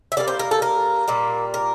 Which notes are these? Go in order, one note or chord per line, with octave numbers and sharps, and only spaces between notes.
E5
D3 G3 A#3 D5
C5
A#4
A4
A#4
A#2 G3 A#3
A#4